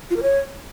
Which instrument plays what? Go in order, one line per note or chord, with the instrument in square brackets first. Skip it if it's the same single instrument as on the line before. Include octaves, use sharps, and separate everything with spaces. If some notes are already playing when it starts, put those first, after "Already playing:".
[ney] F4
A#4
C#5